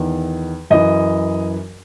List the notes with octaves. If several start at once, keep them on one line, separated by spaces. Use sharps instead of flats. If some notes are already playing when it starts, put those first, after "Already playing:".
Already playing: E2 D#3
F#2 E3 D#5